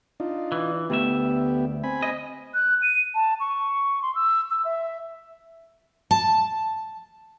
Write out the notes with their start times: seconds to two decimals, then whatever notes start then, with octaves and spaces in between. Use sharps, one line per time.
0.20 D4 D#4 F4
0.52 E3
0.90 D2 A3 B3 G4 E5
1.84 C4 G#5 B5
2.03 D#5
2.54 F#6
2.82 D#7
3.15 A5
3.40 C#6
4.02 C6
4.15 E6
4.51 E6
4.65 E5
6.11 A5